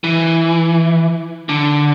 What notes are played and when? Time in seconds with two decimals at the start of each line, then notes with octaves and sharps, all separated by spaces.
0.04 E3
1.49 D3